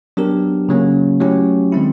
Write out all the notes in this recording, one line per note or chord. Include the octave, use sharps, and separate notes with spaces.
F#3 B3 D4 G4 A#4
C#3 F#3 A#3 C#4
F#3 A3 C#4 E4 G4
D#3 G#3 C4 E4